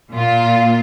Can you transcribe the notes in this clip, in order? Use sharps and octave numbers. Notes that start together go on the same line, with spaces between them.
A#2 F4